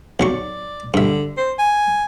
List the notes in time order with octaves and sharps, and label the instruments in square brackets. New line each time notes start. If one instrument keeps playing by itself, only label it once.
[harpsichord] B1 F#3 C#6 [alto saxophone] D5
[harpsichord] G2 E5 [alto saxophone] D3
[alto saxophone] C5
G#5